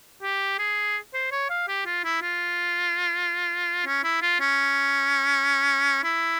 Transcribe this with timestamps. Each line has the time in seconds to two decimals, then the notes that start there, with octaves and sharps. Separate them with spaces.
0.23 G4
0.59 G#4
1.14 C5
1.32 C#5
1.50 F5
1.68 G4
1.86 F4
2.05 E4
2.22 F4
3.86 C#4
4.04 E4
4.22 F4
4.41 C#4
6.04 E4